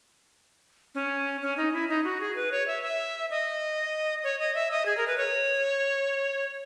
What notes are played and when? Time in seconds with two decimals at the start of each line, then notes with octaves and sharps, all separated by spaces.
0.95 C#4
1.42 C#4
1.57 D#4
1.73 E4
1.89 D#4
2.04 F#4
2.21 G#4
2.36 B4
2.52 C#5
2.67 E5
2.83 E5
3.30 D#5
4.24 C#5
4.39 D#5
4.55 E5
4.71 D#5
4.86 G#4
4.97 A#4
5.07 B4
5.18 C#5